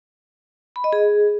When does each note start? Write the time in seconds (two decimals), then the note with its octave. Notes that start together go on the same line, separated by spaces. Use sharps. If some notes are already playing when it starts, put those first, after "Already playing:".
0.76 B5
0.84 D#5
0.93 G#4